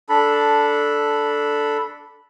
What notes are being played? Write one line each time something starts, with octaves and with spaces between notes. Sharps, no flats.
D4 A4 B5